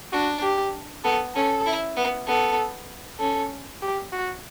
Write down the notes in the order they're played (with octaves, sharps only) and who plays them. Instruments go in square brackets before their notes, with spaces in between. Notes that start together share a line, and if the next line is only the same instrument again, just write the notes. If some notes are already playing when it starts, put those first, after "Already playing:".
[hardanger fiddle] D4 [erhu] F#4
[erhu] G4
[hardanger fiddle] B3 [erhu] A4
[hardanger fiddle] C#4 [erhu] A4
[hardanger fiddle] E4
B3
[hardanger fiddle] B3 [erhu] A4
[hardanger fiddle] C#4 [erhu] A4
[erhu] G4
F#4